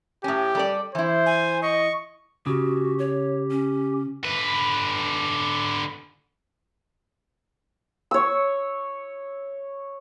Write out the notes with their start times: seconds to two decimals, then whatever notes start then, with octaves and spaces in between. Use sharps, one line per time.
0.24 A2 C#4 G4
0.55 G3 A4 D5
0.95 E3 E4 C5
1.26 G#5
1.62 D#5 C#6
2.46 C#3 F#4 G4
2.99 C#5
3.51 C#4
4.24 D3 B4
8.11 C#5 E6